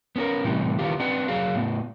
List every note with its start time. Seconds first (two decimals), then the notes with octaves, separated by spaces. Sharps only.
0.16 B3 C#4 G4 A#4
0.44 A2 C3 E3 G3
0.79 D#3 E3 B3 F4 G4
1.00 C4 D4 B4 F#5
1.28 F#3 G#4 F5
1.55 A2 B3